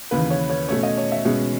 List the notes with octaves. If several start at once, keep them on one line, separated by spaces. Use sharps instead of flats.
D#2 C#3 E3 B4
C#5
C#5
B2 A3 C#4 C#5
D#5
C#5
E5
B2 G#3 C#4